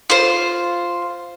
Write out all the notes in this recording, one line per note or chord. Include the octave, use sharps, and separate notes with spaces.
F4 C5